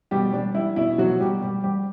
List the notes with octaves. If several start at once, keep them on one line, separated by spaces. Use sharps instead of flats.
B2 G3 G4
G3 D4
G3 E4
B2 E4
B2 F#3 F#4
B2 G3 G4
G3 G4
G3 G4